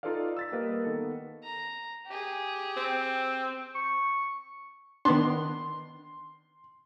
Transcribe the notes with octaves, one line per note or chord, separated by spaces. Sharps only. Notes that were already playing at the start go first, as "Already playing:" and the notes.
D#4 F4 A4 B4 D5 F5
E6 A6 B6
G3 A#3 A#4 B4 D#5 F5
D#3 B3 A4
A#5
G4 G#4
C4
C#6
D#3 B3 D4 C6